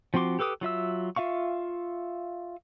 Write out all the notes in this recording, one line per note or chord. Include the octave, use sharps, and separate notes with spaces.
F3 C4 F#4 C6 D6
G4 A4 B4 D6 D#6
F#3 F4 E5 E6
F4 E5 F5 C#6